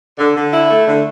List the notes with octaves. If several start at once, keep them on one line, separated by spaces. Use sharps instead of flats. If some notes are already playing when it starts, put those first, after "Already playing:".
D3
D3
E4
A3
D3